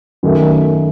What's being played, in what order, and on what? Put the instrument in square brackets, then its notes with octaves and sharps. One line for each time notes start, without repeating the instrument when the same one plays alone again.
[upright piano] F#2 D#3 A3